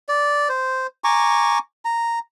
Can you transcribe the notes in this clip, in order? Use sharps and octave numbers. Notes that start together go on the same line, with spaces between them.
D5
C5
G#5 A#5 C#6 D6
A#5